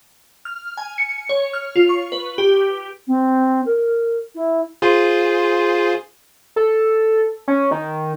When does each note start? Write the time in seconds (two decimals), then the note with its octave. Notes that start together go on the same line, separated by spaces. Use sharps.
0.45 F6
0.77 G#5
0.98 C#7
1.29 C#5
1.53 F6
1.76 F4
1.89 C#6
2.12 B4
2.38 G4
3.07 C4
3.66 A#4
4.35 E4
4.82 F4 G#4 C5
6.56 A4
7.48 C#4
7.71 D#3